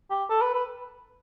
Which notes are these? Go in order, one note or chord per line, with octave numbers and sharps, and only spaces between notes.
G4
A4
B4
B4